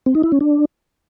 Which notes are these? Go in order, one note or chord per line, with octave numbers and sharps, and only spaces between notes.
C4
D#4
E4
C#4
D4